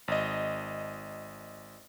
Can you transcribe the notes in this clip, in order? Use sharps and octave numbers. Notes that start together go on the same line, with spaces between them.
G#1 D#5